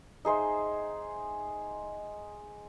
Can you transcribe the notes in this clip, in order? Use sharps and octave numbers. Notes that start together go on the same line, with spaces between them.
D#4 G#4 C5 E5